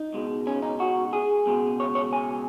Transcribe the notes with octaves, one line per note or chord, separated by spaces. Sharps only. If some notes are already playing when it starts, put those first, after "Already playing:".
Already playing: D#4
C#2 B2 G#3
C#4
D#4
F#4
G#4
C#2 B2 G#3
C#5
C#5
G#5